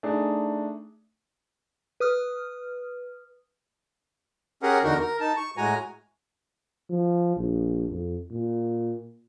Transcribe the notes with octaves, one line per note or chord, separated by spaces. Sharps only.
A3 D4 D#4 G#4
B4 D#6 F6
C#4 G4 G#4 A#4 F#5
E2 D3 D#4 F#4 A#4
A#4
D#4 A5
C#6
A2 G#3 F#4 G#5 A#5
F3
A#1
F2
A#2